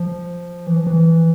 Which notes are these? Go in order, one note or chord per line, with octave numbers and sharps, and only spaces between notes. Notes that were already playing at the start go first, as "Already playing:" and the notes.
Already playing: F3
E3
F3
E3